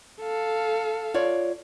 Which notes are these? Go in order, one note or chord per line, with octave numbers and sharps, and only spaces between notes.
A4 F5
F4 C#5 D5